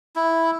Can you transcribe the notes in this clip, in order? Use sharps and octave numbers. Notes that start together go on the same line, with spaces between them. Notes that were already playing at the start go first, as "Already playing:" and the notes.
E4